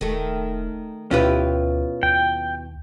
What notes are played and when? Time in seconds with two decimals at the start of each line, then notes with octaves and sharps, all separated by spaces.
0.01 D#1 D#3 A3
1.11 D2 B2 C#4 E4 F4 G4 B4
2.03 D#2 G5